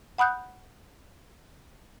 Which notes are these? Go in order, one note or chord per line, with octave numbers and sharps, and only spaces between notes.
F#5 B5 D#6 F#6 G6